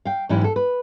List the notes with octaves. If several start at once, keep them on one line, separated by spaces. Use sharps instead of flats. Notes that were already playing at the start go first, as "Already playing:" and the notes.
F5 G5
G#2 E3 F#3 C#4 E4 G4
A4
B4